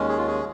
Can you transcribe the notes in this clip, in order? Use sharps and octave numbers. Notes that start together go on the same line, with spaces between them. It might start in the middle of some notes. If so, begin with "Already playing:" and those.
Already playing: D#2 D#3 G#3 C#4
G#4
F4
G#4